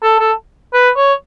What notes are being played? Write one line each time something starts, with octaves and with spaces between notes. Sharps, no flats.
A4
A4
B4
C#5